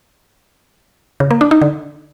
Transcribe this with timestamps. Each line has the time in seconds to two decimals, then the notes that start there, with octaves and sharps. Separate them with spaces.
1.20 C#3
1.31 A#3
1.41 D4
1.51 D#4
1.62 D3